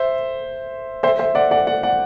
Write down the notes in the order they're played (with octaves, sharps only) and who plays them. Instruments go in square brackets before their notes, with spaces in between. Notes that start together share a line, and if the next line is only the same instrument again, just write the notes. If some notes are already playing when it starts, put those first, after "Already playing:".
Already playing: [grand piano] C5 E5
C5 E5
C5 E5
D5 F#5
D5 F#5
D5 F#5
D5 F#5